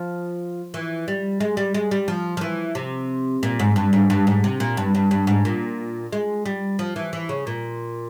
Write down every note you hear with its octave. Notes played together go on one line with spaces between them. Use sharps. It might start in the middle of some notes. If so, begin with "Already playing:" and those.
Already playing: F3
E3
G3
G#3
G3
G#3
G3
F3
F3
E3
C3
A#2
G#2
G2
G#2
G2
G#2
C3
A#2
G2
G2
G2
G#2
A#2
G#3
G3
F3
E3
E3
C#3
A#2